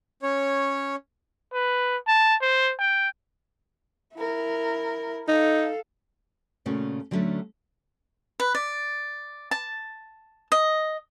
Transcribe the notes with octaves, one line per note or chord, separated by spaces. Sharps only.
C#4 C#5
B4
A5
C5
G5
E4 A#4
D#4 A4 F5
A#2 C#3 A3 C#4 F#4
D3 F#3 G3 A3 C#4 D4
B4
D5
A5
D#5